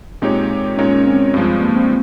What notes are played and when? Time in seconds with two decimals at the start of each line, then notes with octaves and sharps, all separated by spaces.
0.22 A#2 G#3 C4 D#4 G4 C#5
0.77 A#2 G#3 C#4 D#4 A#4 C#5
0.92 C#4
1.06 C4
1.34 G2 F3 G#3
1.62 A#3
1.76 C4